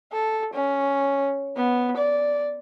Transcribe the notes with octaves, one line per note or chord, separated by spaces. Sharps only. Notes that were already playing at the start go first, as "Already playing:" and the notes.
A4
C#4
B3
D5